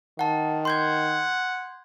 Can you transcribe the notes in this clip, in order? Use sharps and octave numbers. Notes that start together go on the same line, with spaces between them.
D#3 F#5 A5
F#5 C6 G6 G#6